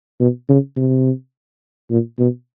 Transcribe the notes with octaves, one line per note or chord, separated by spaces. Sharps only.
B2
C#3
C3
A#2
B2